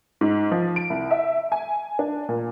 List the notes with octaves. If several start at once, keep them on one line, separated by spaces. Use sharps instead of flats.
G#2
F3
D7
C2
E5
G#5
D4
A#2